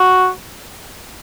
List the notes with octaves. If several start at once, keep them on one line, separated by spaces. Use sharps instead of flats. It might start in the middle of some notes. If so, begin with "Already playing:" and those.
Already playing: F#4